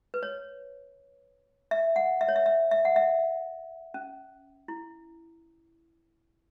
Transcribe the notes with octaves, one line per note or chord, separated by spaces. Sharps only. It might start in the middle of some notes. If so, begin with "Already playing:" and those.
B4
C#5
E5
F#5
E5
C#5
E5
E5
E5
F#5
E5
C#4
E4